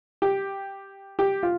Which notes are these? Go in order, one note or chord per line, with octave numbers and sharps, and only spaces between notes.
G4
G4
F4